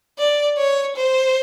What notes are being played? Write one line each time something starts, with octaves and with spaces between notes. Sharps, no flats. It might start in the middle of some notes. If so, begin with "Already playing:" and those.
D5
C#5
C5